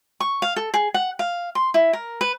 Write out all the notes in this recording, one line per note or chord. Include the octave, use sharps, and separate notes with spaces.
C#6
F5
A4
G#4
F#5
F5
C6
E4
A#4
B4